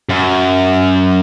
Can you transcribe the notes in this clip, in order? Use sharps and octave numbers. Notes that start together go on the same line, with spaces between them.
F#2